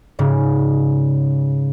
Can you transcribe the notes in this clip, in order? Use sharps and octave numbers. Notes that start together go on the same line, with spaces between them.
G#2 C#3